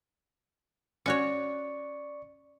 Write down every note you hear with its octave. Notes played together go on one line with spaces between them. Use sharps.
C#4 F#4 C#5 D5 C#6 C#7